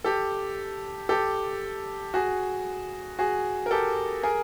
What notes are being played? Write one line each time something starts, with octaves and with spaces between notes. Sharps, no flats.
G4 A4
G4 A4
F#4 G#4
F#4 G#4
A#4
G4 A4
G#4 A#4